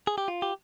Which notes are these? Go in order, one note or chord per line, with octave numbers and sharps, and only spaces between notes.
G#4
G4
F4
G4